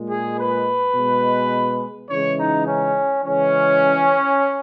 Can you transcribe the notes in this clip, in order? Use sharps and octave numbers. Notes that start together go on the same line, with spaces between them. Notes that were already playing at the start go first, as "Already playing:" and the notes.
Already playing: A#2 G#3
G#4
B4
B2 G#3
C#3 E3 G#3 C#5
D#4
C#4
C#3 E3 G#3 C#4